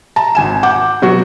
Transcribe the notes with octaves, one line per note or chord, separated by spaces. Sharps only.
A5 A#5
G#1 G#5 E7
F#5 D6 G6
B2 F#3 F#4